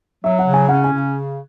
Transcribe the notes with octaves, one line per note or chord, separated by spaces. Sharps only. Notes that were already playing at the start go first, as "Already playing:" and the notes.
F#3 E5
F#5
C#3
G#5
C#4 F#5
G#5
C#3